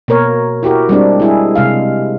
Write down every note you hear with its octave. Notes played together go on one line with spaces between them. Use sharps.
B2 A#3 A#4 C#5
E4 F#4 G4 A#4
G3 G#3 C4 D4
G#3 E4 G#4
C3 G#3 F5